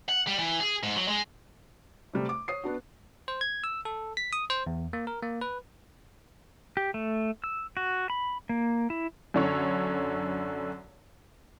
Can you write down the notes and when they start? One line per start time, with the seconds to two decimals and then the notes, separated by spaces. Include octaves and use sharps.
0.09 F#5
0.27 G3
0.39 E3
0.61 G#4
0.83 G#2
0.96 F#3
1.08 G#3
2.14 C3 G3 A3
2.29 D6
2.48 C#5 D#6 C7
2.64 B3 D4 F#4
3.28 C5
3.41 G#6
3.64 E6
3.85 A4
4.17 B6
4.33 D#6
4.50 C5
4.66 E2
4.93 A#3
5.07 A#4
5.22 A#3
5.41 B4
6.77 G4
6.94 A3
7.44 E6
7.77 F#4
8.10 B5
8.49 A#3
8.90 E4
9.34 F#2 D3 C#5